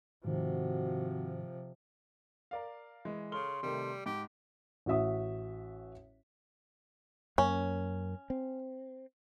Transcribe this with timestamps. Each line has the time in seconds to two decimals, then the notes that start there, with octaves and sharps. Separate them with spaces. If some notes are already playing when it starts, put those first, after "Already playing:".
0.25 G#2 C3 D#3 F3 C4 F#4
2.51 A#4 D5 F5
3.05 E3 G#3
3.32 C#3 A4 C6 F6 G7
3.63 C3 D#3 G3 A3
4.06 G#2 G4
4.86 A1 F#4 E5 D#6
7.38 F#2 A#3 C#4
8.30 C4